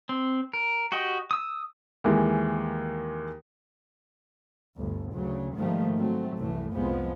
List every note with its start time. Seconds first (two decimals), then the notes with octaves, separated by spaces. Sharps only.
0.09 C4
0.53 A#4
0.92 F#4 G4 D#5 G5
1.31 D#6 E6
2.04 D#2 E3 G#3
4.78 G1 D2 G2
5.14 D2 C#3 F#3
5.55 G#2 D#3 F3 G3 A3 A#3
5.97 F#3 A3 C4
6.36 C2 F#2 A2 E3 A3
6.72 C2 F2 F3 G#3 B3